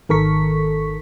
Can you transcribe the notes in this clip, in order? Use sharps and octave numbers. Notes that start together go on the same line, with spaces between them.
G#1 D#3 A4 A#4 C#6 B6